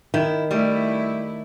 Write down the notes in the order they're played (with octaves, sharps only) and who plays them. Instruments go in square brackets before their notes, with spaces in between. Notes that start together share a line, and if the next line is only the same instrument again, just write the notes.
[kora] D#3 [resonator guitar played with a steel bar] E4
[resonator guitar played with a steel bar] G3 [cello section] A3 E4